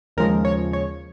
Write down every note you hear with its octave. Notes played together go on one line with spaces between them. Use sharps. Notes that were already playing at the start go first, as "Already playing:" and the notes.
D#2 C#3 F3 G#3 A#4
C#5
C#5